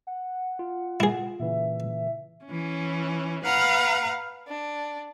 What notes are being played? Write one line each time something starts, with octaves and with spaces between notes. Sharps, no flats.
F#5
F4
E4 G#4
A#2 C#3 E3 E5
E3 C#4
B4 F5 F#5 A#5
D4